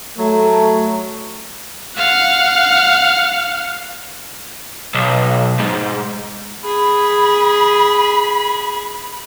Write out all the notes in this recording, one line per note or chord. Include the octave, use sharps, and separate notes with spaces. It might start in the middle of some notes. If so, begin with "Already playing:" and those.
F#3 A3
F5 F#5
B1
G#2
G#4 B5